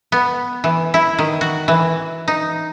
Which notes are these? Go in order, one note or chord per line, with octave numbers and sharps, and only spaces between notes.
B3
E3
E4
D#3
F#4
E3
D#4